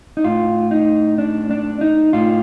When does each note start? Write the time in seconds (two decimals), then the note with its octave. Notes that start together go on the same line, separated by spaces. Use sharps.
0.17 D#4
0.24 A2 F4
0.71 D#4
1.18 D4
1.51 D4
1.81 D#4
2.13 A2 F4